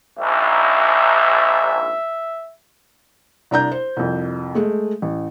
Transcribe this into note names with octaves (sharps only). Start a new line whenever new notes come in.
A#1 G#2 E5
C2 D4 A#5 G6
C5
C2 F2
G#3 A3
A1